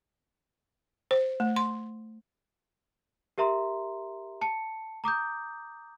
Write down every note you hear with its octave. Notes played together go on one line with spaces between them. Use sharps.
C5
A3
C6
G4 A#4 E5 A#5 C6
A5 C#7
A#5 D6 D#6 G6